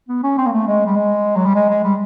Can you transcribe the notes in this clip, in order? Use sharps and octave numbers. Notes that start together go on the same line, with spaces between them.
B3
C#4
C4
A#3
A3
G#3
G3
G#3
F#3
G3
G#3
G#3
G3